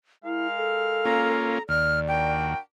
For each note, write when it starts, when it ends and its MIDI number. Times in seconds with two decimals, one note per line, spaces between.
0.25 1.53 56
0.25 0.47 64
0.25 1.53 70
0.25 1.53 77
0.57 1.59 69
1.05 1.58 58
1.05 1.58 61
1.05 1.58 65
1.05 1.63 82
1.69 2.54 39
1.69 2.32 74
1.69 2.00 89
2.08 2.60 62
2.08 2.60 66
2.08 2.60 70
2.08 2.58 79